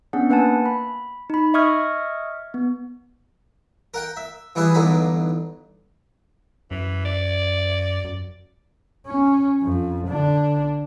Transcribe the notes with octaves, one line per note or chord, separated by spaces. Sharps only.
B3 C#4 D4 G#4 F#5
A#3 B4 F#5 G#5 A5
B5
D#4 B5
D#5 E5 C#6 D#6 F6 G#6
B3
A#4 F#5 G5
E5
E3 G3 E4 G#4 B4
B1 E2 G2 D3 D#4 B5
F#2 E3
D5
F#2
C#4
F2
D3 D4